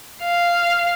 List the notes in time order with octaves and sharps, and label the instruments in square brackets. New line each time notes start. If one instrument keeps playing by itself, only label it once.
[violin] F5